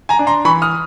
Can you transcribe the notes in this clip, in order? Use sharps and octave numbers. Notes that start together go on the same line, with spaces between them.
G#5 A#5
D4
A#5 C6
E3 B5 C#6
D#6 F6